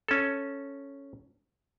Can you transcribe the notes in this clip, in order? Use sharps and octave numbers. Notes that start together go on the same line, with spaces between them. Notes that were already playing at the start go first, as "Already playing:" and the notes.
C#4 A4